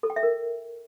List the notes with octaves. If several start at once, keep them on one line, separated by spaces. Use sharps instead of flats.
A4
G5
E5
A#4